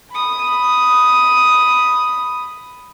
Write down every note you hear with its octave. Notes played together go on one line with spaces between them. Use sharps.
B5 D#6